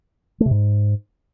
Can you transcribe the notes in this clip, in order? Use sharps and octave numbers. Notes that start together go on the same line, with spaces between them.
A3
C3
G#2